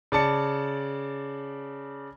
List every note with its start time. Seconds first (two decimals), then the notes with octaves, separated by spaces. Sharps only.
0.12 C#3 D5 A5 C#7